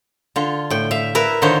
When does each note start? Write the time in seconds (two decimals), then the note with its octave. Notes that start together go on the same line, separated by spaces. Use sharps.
0.36 D3 F4
0.70 A2 G5
0.91 E5 F5
1.15 E4 A#4 B4 E5
1.42 D3 D#3 D#4 F4 C5 C#5